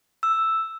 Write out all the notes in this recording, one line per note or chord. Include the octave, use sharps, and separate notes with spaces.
E6